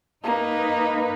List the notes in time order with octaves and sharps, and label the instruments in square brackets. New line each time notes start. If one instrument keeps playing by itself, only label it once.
[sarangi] A#3 [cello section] D#4 B4